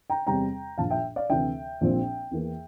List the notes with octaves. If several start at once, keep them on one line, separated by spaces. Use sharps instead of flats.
G5 A#5
E2 C3 G3 C4 G5 A#5
A#1 A#2 F3 F5 A5
E5 G5
D5 F5
D2 C3 E3 E5 G5
A#1 A#2 F3 C4
E2 E3 A#3